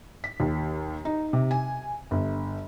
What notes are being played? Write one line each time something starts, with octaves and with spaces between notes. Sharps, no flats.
B6
D#2
D#4
C3
G#5
G1